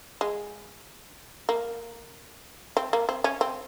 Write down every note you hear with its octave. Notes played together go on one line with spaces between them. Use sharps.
G#3
A#3
C4
A#3
C4
C#4
C4